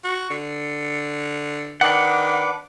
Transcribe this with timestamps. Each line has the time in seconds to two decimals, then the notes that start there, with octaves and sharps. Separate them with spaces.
0.04 F#4
0.30 D3
1.81 D#3 D4 B4 F#5 D6